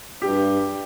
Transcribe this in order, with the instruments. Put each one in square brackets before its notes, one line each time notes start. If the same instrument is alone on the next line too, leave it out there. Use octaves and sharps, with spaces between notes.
[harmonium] G2 [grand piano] G4